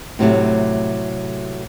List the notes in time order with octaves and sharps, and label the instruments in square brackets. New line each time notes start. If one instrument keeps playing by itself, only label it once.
[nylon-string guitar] A2 C3 F#3 A3